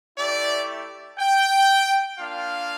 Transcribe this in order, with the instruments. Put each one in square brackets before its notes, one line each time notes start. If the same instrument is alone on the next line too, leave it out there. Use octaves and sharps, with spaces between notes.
[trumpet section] A3 E4 G4 D5
G5
A#3 D4 F4 F5